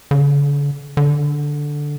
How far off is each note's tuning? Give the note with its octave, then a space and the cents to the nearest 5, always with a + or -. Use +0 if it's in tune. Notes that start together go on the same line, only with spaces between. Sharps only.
D3 -45
D3 +0